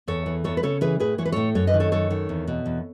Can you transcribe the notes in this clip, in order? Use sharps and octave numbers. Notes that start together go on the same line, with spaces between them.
E2 A4 C#5
E3
E2 A4 C#5
B4
C#3 A4 C#5
E3 G#4 B4
A2 G#4 B4
E3 C#5
B4
A2 A4 C#5
F#2 A4 C#5
B4 D#5
D#3
A4 C#5
F#2 A4 C#5
D#3
E2
B2
E2